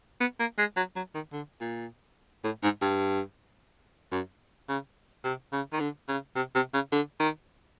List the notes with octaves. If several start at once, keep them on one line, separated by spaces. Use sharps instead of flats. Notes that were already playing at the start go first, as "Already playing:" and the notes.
B3
A#3
G#3
F#3
F#3
D#3
D3
A#2
A2
G#2
G2
F#2
C#3
C3
C#3
D#3
D3
C#3
C3
C3
C#3
D3
D#3